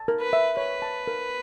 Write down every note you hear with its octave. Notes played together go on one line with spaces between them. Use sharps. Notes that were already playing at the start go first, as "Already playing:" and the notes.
Already playing: A5
A#4
B4
E5
B4 C#5
A5
A#4